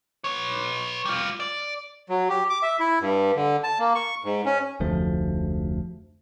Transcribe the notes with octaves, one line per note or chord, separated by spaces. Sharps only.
B4 C#5
G3 F4
D5
F#3
G4
D6
E5
E4
G2
D3
A5
A#3
C#6
G#2
C#4
F1 D2 F3 A3